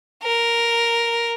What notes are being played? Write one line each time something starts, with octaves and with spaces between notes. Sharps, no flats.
A#4